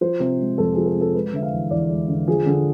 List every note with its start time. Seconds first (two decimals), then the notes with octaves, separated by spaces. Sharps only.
0.01 F3 C5
0.20 C3
0.40 G#3
0.58 F2 A4
0.73 F3 G#4
0.86 A4
0.95 C3
1.01 A4
1.15 G#3 B4
1.33 D3 E5
1.42 F5
1.53 E2
1.71 E2 D5
1.90 G#3
2.08 D3
2.28 F3 G#4
2.46 D3